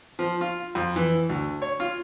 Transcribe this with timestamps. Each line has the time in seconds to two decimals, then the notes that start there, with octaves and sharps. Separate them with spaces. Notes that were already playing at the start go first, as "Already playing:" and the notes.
0.19 F3
0.41 F4
0.75 F2
0.96 E3
1.29 D2
1.62 C#5
1.80 F4